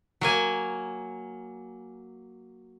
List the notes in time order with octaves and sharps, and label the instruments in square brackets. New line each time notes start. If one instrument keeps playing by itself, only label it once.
[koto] F#3 A#3 G#5